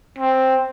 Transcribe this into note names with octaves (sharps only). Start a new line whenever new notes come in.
C4